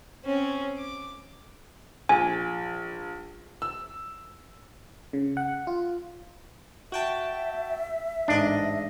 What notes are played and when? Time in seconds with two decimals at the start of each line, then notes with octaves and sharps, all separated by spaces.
0.24 C4 C#4
0.77 D6
2.09 A#1 G#5
3.62 E6
5.13 C#3
5.37 F#5
5.67 F4
6.92 F#4 E5 G5 A5
8.28 A1 G#2 D4 D#5